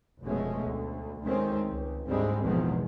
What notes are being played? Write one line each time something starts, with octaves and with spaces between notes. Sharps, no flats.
F1 B2 G#3 A3 C#4
D2
D2 D#3 G#3 C4 C#4
C#2
D2 G#2 G3 G#3 C4
A1 E2 B2 D#3 F3 G#3